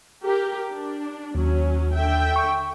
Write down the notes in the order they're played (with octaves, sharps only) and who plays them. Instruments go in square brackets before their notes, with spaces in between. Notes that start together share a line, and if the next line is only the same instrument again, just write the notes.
[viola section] G4 A#4
D4
[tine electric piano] D#2 [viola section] F#3 C#4
[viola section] D3 E5 G5
[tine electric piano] C#6